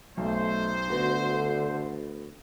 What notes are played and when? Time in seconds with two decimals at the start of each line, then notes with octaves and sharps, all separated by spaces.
0.17 B1 A3 C5
0.89 D2 D3 B3 F#4